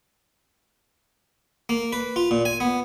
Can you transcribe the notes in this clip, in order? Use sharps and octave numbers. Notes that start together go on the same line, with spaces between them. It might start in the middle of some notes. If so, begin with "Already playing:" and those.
A#3
B4
F4
A#2
G#5
B3